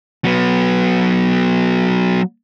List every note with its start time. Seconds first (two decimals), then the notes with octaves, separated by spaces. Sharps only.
0.25 F#3 B3